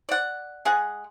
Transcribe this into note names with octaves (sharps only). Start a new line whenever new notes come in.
D5 F#5
G#3 G#4 F#5